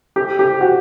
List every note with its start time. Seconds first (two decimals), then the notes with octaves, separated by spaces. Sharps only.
0.16 G4
0.39 G4
0.61 F#4